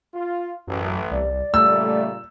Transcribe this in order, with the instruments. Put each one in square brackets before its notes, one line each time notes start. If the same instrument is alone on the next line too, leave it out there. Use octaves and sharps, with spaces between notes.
[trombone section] F4
[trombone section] A1 [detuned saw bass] F#2
[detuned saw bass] C2 [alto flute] D5
[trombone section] A#2 C#3 G3 [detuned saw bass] A3 [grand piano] E6